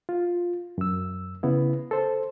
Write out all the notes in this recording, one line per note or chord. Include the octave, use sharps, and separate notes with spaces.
F4
F#2 E6
C#3 B3 E4
A4 C5